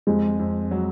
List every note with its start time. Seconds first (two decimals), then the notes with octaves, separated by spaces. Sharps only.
0.07 F2 G#3
0.39 F2
0.71 F#3